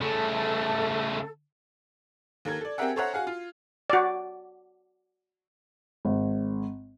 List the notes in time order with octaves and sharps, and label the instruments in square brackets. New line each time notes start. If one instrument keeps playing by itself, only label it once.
[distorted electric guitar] C#3 A3 [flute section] A4
[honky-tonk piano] D#2 A4 A#4 G#6
A4 D5
C4 G4 G#4 A#4 E5 F#5
A4 C5 C#5 E5 F#5 A#5
F#4 G#4 F5 F#5
F4
[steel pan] F#4 D5
[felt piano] G#1